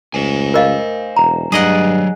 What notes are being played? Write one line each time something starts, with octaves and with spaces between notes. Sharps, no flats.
C#2 C5 G#5
A#4 D#5 F5
E1 A#5
G2 F#3 G#4 D5 D#5 F#5